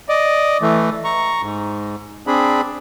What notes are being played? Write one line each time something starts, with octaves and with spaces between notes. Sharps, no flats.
D5 D#5
E3 A3
A#5 C#6
G#2
C4 D4 G#4 B5